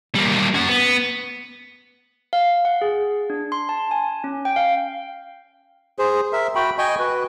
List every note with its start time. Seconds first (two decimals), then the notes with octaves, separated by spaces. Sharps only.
0.15 G3 A#3
0.54 C#4 F#5
0.69 B3
2.33 F5
2.65 F#5
2.81 G#4
3.30 D4
3.52 C6
3.69 A5
3.91 G#5
4.24 C#4
4.45 G5
4.56 F5
5.99 G#4 C5
6.33 A#4 E5
6.55 F#4 G5 B5
6.78 D#5 G5 G#5 C#6
6.99 F#4 B4